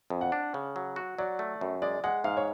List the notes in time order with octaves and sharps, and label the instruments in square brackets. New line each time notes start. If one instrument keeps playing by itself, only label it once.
[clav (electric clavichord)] F2
[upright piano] F#5
[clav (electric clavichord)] D4
C#3
F#3
F#4
[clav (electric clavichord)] F#3 [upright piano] D5
[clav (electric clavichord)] A3
F#2
[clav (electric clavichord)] G#3 [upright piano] D5
[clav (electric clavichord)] G#3 [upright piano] F#5
[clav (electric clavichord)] G#2 [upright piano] F5
[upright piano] C#5